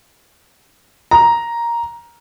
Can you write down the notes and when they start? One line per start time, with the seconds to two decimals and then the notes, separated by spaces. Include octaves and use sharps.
1.11 A#5